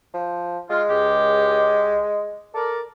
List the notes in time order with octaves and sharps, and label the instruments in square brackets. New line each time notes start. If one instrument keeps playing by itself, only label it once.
[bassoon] F3
[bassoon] G#3 [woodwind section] F4
[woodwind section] C#2 G4
A4 A#4 D5